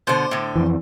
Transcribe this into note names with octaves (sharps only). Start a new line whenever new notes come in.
B2 D3 C5
A2 D3
F2 E3